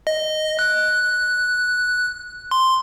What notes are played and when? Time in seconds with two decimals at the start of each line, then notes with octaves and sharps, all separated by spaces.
0.07 D#5
0.59 F#6
2.51 C6